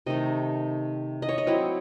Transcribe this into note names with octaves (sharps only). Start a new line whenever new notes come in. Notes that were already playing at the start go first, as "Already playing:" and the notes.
C3 D#3 A3 D#4 D#5
D#5
C#5
D#5
F#3 C4 E4